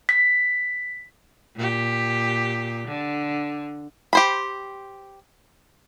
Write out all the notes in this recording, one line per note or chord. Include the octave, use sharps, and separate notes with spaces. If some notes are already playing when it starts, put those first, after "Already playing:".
B6
A#2 G4
D3
G4 C5 B5